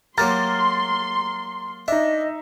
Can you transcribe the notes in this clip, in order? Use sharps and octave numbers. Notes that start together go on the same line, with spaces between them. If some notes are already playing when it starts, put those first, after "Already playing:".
F#3 A#3 G4 A#5 C6 F6 A6
D4 D#4 D#5 E5